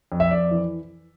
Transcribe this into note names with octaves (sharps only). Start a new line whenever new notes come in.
F2
E5
F2 D5
E3